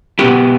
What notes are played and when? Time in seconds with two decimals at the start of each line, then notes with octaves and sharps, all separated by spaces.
0.19 B2 B3 E4 G4